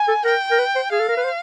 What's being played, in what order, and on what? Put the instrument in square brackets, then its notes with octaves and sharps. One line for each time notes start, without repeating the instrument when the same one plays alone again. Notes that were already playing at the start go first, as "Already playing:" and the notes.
Already playing: [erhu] G#5
[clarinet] A4
[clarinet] A#4 [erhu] G5
[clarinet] A#4
B4
C5
[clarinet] G#4 [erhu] F5
[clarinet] A4
A#4
B4
C5